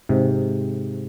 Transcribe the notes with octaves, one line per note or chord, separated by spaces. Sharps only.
G#2 C3